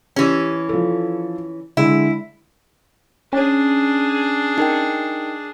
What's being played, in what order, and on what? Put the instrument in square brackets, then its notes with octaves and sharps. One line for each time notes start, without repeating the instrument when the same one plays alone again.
[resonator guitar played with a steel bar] E3 C#4 [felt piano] G4
[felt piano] F3 A4
[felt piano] D3 G#3 [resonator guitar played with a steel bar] E4
[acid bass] C#4 [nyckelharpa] D4 G#4
[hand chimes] D#4 A#4 G5